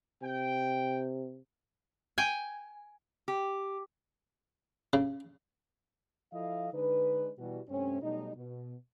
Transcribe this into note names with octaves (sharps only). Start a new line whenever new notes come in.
C3 G5
G5 G#5
G4
C#3
F3 E4 A4 D#5 F5
D3 G#3 D4 D#4 B4
B2 E3 G3 F#4
G2 C3 A3 C4 C#4
B2 F#3 G3 A3 D#4
B2